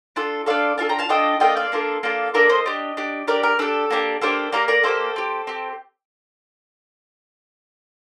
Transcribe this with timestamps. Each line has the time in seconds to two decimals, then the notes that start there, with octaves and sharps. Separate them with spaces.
0.16 D4 F4 A4
0.46 D4 F4 A4 D5 F5
0.78 D4 F4 A4 F5 A5
0.89 G5 A#5
0.99 F5 A5
1.09 D4 F4 A4 D#5 G5
1.40 A#3 D4 F4 A4 D#5 G5
1.57 D5 F5
1.72 A#3 D4 F4 A4
2.03 A#3 D4 F4 A4
2.34 A#3 D4 F4 A4 A#4 D5
2.49 C5 D#5
2.66 D4 G4
2.97 D4 G4
3.27 D4 G4 A#4 D5
3.43 A#4
3.59 D4 G4 A4
3.90 A#3 D4 G4
4.21 A#3 D4 G4 A4 C5
4.52 A#3 D4 G4 A#4 D5
4.68 A#4 D5
4.83 A#3 D4 G4 A4 C5
5.16 C4 G4
5.47 C4 G4